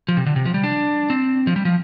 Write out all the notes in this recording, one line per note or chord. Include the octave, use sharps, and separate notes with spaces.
F3
C3
D3
C3
F3
G3
D4
C4
F3
G3
F3